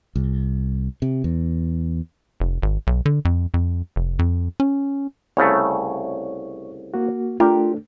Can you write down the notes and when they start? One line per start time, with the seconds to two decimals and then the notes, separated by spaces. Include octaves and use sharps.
0.16 C2
1.02 C3
1.24 E2
2.40 F1
2.62 G#1
2.87 B1
3.06 D3
3.25 F2
3.54 F2
3.96 F1
4.19 F2
4.60 C#4
5.37 C2 C#3 A3 C#5 C#6
6.94 A#3 F#4
7.40 A3 D4 F4 G4 A4 A#4